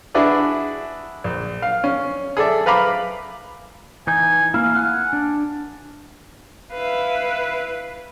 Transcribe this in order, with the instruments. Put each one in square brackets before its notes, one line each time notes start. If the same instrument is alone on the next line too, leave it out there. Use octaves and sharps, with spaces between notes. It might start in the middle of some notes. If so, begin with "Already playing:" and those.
[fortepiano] D4 E4 F#4 G#4 B4 D5
A#1
F5
C#4
G#4 A4 D5 E5
B4 F5 A#5 B5 D6
[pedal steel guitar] E3 D#4 G6 [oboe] G#5
[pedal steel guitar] A#3 E4 [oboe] F5
[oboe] F#5 [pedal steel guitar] G#5 F6
[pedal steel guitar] D4
[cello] E4 F5 [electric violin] B4